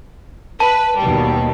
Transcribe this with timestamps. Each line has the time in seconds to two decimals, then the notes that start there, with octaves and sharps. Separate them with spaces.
0.60 B4 A5
0.98 D#2 B2 G3